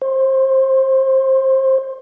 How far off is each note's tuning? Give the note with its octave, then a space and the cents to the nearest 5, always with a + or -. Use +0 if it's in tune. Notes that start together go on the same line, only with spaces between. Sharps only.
C5 +25